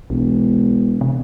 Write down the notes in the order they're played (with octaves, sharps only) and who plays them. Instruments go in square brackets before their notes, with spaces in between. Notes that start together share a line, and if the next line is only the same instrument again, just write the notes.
[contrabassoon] E1 [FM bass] B1
[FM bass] C3